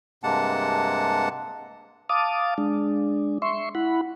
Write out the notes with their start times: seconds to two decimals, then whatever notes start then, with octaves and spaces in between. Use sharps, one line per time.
0.23 G2 C3 G#3 A#3 F#5 A5
2.09 F5 A5 D6 D#6
2.58 G#3 D4
3.42 E5 C6 C#6
3.75 E4 F#5 B5